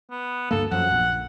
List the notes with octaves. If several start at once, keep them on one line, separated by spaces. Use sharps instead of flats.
B3
D2 G2 A#3 A4
F#2 F3 F#5
A#1